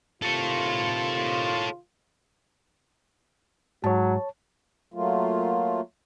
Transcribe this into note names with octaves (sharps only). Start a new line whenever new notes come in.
C3 D#3 F4 A4 C#5
G#2 F#3 C#5 A5
F#3 A3 A#3 F4